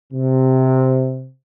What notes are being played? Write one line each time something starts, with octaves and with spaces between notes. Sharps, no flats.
C3